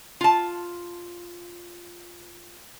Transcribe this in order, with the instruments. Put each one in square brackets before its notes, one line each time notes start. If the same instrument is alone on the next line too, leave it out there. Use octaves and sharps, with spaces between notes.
[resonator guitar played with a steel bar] F4 A5